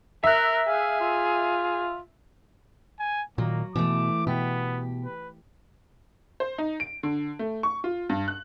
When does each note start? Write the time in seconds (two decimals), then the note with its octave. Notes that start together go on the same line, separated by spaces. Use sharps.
0.24 A#4 E5 F#6
0.68 G#4 F5
1.01 F4
3.00 G#5
3.38 A#2 D#3 F#3 A#3
3.76 B2 E3 A3 D6
4.27 B2 B3 G4
5.05 B4
6.40 C5
6.58 D#4
6.80 D7
7.03 D3
7.39 A3
7.63 C#6
7.84 F4
8.09 G2
8.28 F#6